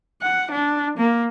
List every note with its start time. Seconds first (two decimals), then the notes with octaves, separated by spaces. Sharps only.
0.22 F#5
0.51 D4
0.97 A#3